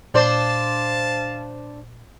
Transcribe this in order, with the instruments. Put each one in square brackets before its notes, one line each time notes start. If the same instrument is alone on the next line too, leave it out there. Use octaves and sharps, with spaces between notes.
[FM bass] A#2 [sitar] D4 C5 D5 [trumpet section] F5 A5